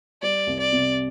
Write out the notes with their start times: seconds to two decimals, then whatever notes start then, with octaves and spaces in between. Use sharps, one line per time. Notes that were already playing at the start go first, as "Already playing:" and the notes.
0.22 G3 D5
0.47 C2
0.60 D5
0.72 C3